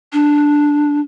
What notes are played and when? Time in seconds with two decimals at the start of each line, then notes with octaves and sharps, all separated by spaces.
0.13 D4